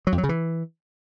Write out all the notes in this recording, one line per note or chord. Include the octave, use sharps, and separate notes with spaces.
F#3
F2
F#3
C#3
E3